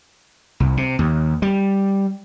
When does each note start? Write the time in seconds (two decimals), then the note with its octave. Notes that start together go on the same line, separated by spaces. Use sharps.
0.60 C2
0.77 C3
0.99 D#2
1.42 G3